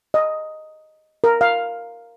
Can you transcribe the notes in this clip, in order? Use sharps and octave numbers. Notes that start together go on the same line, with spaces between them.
D#5
A#4
F5